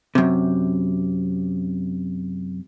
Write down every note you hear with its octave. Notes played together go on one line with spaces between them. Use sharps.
F#2 C3